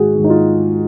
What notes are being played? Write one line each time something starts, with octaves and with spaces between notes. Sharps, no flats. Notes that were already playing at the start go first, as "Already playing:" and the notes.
Already playing: G#2 D#3 F#4 G#4
G#2 D#3
D#4
F4